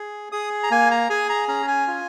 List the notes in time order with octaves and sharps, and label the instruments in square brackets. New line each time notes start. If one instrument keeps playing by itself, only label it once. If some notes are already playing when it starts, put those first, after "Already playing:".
Already playing: [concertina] G#4
G#4 D#6
A#5
A#3 G#5
A#5
G#4 G#5
A#5
C#4 A#5
G#5
F4